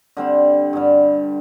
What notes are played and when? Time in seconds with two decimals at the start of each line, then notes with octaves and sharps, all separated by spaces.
0.17 D3 G3 C4
0.73 G2 D3 G3